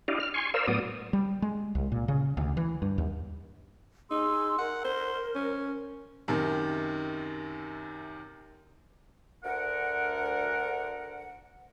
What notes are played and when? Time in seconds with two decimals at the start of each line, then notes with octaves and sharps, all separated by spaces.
0.08 D4 E4 G4 D5 D#5 F5
0.20 F6
0.34 G#5 C6 C#6
0.54 A#4 C5 D5 F5 E6
0.67 A2 F#3 B3 D5 D#6
1.13 G3
1.42 G#3
1.75 C2
1.92 A#2
2.08 C#3
2.37 D2
2.57 E3
2.82 G2
2.98 D#2
4.11 D#4 G#4 C6 E6
4.58 A#4 F#5
4.84 C5
5.35 C#4
6.28 F#2 C3 D#3
9.43 D2 A#4 F#5